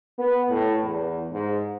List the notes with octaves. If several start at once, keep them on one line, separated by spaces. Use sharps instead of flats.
B3
A2
E2
G#2